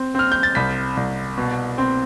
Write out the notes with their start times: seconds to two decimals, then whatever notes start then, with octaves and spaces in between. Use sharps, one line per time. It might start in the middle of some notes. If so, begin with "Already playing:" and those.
Already playing: C4
0.15 C4 F6
0.32 G6
0.43 A6
0.55 C2 B6
0.97 C2
1.38 B2
1.78 C4